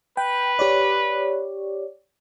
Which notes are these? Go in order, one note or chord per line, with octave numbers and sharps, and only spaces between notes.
B4 G5
G4 C#5 D5